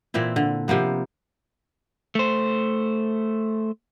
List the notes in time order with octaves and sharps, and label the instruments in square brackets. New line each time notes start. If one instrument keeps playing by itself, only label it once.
[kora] A#2 E3 C4 E4
D3
C3 F3 A#3 B3
[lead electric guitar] A3 C5